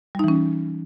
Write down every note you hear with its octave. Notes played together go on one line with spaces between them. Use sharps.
E3 G3 C#4 D#4